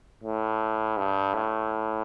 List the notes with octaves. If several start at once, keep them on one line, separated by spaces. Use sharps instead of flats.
A2
G2
A2